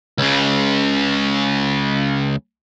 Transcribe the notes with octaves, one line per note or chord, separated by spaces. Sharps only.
C#2 C#3